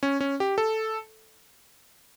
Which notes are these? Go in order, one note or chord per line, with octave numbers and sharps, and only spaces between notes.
C#4
C#4
G4
A4